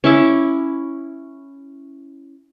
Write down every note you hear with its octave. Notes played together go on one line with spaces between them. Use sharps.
C#4 E4 D6